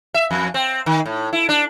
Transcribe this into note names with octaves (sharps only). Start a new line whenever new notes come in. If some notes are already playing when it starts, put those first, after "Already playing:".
E5
F2
C4
D#3
A2
E4
D4